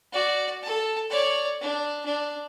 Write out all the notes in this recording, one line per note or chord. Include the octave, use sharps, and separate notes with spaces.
F#4 D5
A4 A5
C#5 D5
D4
D4